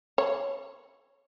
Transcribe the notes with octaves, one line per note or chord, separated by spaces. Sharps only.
C#5